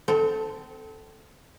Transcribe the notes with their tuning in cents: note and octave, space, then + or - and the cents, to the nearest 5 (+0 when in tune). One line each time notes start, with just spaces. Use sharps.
C4 -30 A4 +0